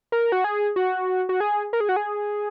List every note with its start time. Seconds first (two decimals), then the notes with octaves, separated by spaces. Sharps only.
0.12 A#4
0.32 F#4
0.44 G#4
0.76 F#4
1.29 F#4
1.40 G#4
1.73 A#4
1.80 G#4
1.89 F#4
1.96 G#4